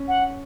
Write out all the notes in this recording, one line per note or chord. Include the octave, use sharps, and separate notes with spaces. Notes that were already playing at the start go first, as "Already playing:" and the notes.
Already playing: C#4
F#5